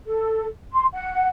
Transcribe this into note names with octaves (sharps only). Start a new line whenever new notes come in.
A4
C6
F#5